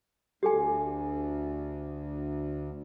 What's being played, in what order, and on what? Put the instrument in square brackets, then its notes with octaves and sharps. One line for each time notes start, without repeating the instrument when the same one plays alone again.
[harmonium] D2 [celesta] G4 A4 G#5